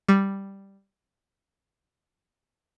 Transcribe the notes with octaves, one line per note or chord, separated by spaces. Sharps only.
G3